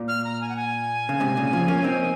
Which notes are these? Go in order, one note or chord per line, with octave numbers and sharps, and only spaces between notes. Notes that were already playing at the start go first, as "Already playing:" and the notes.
Already playing: A#2
F6
A#5
G#5
F#5
G#5
C#3
G#2 C3
A#2 C#3
C#3 F3
A#3 C#4
C4 D#4